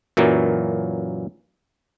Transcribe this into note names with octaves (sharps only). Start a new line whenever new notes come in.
F#2 A#2 E3 F#3 A#3